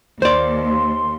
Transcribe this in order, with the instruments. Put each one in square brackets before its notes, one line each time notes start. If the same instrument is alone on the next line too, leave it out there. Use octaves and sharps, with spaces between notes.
[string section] D#2 [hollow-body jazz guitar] C5 D5 [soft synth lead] C6